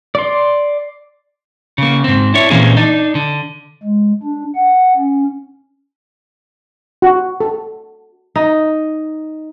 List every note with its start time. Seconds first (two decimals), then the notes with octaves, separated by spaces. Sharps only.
0.15 D5 C6
1.78 C#3 A#3
2.04 G#2 C4
2.34 D4 E4 C#5
2.50 A#2 E3 A#3 C4 C#4 G#4
2.77 D4 D#4
3.15 D3
3.83 G#3
4.23 D4
4.55 F#5
4.96 C#4
7.02 F#4
7.40 A4
8.36 D#4